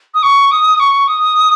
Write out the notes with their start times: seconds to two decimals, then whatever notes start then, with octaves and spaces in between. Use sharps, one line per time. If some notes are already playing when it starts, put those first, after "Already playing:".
0.14 D#6
0.23 C#6
0.52 D#6
0.80 C#6
1.08 D#6